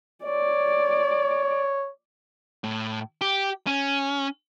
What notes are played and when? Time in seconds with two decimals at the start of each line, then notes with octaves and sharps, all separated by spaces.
0.24 C#5 D5
2.64 A2
3.21 G4
3.67 C#4